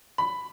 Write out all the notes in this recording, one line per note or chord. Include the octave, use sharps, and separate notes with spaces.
B5